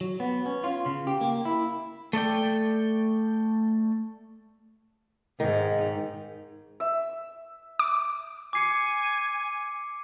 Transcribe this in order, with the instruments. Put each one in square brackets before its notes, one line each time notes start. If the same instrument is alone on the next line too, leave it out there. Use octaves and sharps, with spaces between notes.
[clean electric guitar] F#3
B3
C#4
F4
C#3
G4
A#3
E4
[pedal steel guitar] A3 A4 D5 G5
[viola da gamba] G#2 [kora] D#3
[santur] E5
[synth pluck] D6
[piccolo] G#5 [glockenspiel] D6 C7 C#7